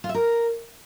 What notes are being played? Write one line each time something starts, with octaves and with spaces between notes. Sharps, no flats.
F4
E5
A#4